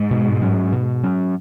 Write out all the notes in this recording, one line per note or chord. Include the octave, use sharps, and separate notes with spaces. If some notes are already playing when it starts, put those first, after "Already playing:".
Already playing: G#2
B2
F#3 C#4
B2
F#3 C#4